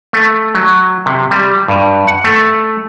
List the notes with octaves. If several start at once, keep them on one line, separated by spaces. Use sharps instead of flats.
A3
F#3
C3
G3
G2
F#5
A3